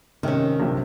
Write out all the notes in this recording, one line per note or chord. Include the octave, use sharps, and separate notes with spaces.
C3 D#3 C#4
A#1 F#2 C3